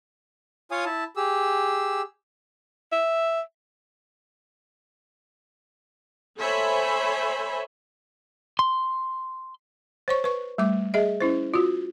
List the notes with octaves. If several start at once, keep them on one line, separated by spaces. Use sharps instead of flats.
F4 C#5 F5 G#5 D#6
E4 A5
G4 G#4 E6
E5
A4 C5 C#5 E5 G#5 B5
C6
C5 C#5 C#6
B4 C#6
G3 A3 D6
G#4 D#5 E5
C#4 E4 C5
F4 F#4